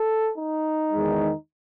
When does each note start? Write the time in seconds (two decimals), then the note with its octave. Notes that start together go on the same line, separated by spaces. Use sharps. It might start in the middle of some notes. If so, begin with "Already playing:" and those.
Already playing: A4
0.37 D#4
0.93 E2 D#3 G#3